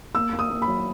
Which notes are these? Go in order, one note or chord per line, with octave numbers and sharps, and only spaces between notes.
A#3 E6
A#3
D#6
A#3
B5
F#3